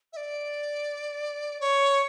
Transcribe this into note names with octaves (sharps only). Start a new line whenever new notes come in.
E5
D5
C#5